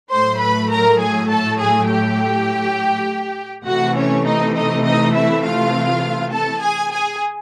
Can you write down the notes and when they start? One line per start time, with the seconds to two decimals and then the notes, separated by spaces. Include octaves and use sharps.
0.11 A2 F#3 A3 C5 C6
0.41 B4 B5
0.71 A#4 A#5
1.00 G#4 G#5
1.30 A4 A5
1.60 G#4 G#5
1.89 G4 G5
3.66 C3 E3 A3 F#4 F#5
3.96 C#4 C#5
4.26 D#4 D#5
4.55 D#4 D#5
4.85 D#4 D#5
5.14 E4 E5
5.44 F4 F5
6.32 A4 A5
6.61 G#4 G#5
6.92 G#4 G#5